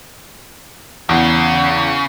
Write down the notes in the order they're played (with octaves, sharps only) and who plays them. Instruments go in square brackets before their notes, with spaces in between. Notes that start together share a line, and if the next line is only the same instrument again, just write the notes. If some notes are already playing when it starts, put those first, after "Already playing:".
[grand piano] E2 [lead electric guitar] C#3